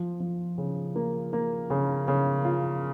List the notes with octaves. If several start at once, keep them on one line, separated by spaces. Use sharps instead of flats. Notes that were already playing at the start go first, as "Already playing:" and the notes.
Already playing: F3
F3
C#3
A#3
A#3
C#3
C#3
F4